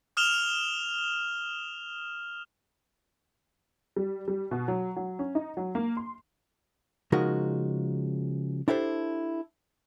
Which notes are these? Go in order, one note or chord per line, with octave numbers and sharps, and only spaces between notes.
D#6 F6 E7 F7 G7
G3
G3
B2
F#3
F#3
C#4
D#4
F#3
A#3
C6
C#3 F3 G#3 D#4 F#4 A#4
D4 E4 G4 A4 C5